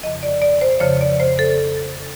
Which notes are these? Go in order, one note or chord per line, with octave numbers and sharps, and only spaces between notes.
F2 C#3 F3 D#5
D5
D5
C5
F2 C#3 F3 C#5
D5
C5
A4